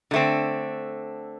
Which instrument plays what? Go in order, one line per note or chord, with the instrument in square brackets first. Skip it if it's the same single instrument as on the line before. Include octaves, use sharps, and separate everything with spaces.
[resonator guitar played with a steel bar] D3 A3 C4